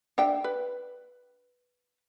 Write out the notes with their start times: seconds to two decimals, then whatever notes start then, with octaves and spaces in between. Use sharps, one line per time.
0.18 D4 E5 G5
0.44 B4